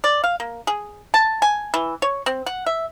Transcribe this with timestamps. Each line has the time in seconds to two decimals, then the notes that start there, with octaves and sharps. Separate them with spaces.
0.04 D5
0.24 F5
0.40 A#3
0.67 G#4
1.14 A5
1.42 G#5
1.74 E3
2.02 C#5
2.26 C4
2.46 F#5
2.66 E5